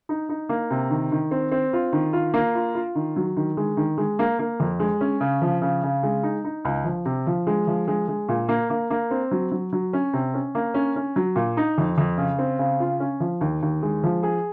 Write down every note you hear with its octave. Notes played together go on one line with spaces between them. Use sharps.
D#4
D#4
A#3
C3
D#3
D#3
C4
C4
F4
D#3
F4
A#3
F4
F4
D#3
F#3
D#3
G#3
D#3
G#3
A#3
A#3
F2
G#3
C#4
C#3
F3
C#3
C#3
G#3
D#4
D#4
C#2
F3
C3
F3
G#3
F3
G#3
G#3
A#2
A#3
A#3
A#3
C4
F#3
F#3
F#3
C#4
C3
C#4
A#3
C#4
C#4
F#3
A#2
D#4
F2
F2
C#3
C4
C#3
F4
C#4
F3
D#2
D#2
G#3
F3
G#4